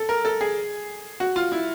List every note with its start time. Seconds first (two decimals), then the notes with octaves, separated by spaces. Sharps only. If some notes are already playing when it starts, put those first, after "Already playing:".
Already playing: A4
0.09 A#4
0.25 A4
0.41 G#4
1.20 F#4
1.36 F4
1.52 E4